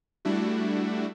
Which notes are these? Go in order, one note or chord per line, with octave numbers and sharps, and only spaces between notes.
G3 A3 D4 E4 F#4